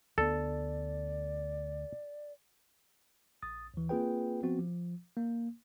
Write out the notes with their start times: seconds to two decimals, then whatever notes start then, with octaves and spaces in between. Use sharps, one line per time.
0.18 D2 B3 A4 D5
3.42 A#1 D#6 A6
3.74 D#2 E3
3.89 A#3 C4 F4 G#4 B4 G5
4.43 F3 B3 C4 F#4
4.58 F3
5.17 A#3